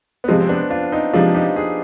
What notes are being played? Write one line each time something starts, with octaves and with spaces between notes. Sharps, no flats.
B3
C3 F3 G#3 C4
C4
B3 D4
D4 F4
C4 D#4
C3 F3 G#3 D4 F4
D#4 G4
F4 G#4